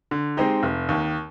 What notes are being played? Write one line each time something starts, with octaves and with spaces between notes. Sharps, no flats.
D3
G#3 C4 D#4 G4
F1
D#2 D#3